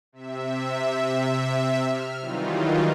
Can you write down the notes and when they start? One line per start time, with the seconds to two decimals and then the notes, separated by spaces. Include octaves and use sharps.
0.12 C3 E5
1.84 F6
2.21 D#3 E3 F#3 G3 D#4 F4